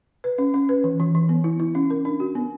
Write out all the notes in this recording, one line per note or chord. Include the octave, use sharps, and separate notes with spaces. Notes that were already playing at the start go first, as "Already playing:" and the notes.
B4
C#4
C#4
B4
E3
E3
E3
B3
E4
E4
C#4
A#4
D4
F#4
B3